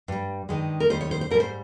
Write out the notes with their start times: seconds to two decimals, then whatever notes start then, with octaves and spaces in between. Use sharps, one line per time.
0.08 G2 G3
0.49 G2 D#3 G#3
0.80 A#4
0.90 D#2 D#3 G3 C5
1.01 C#5
1.11 C5
1.21 C5
1.30 G#2 G3 A#4
1.40 C5